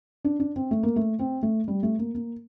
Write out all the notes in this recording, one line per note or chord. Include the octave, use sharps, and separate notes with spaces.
D4
D4
C4
A3
A#3
A3
C4
A3
G3
A3
A#3
A#3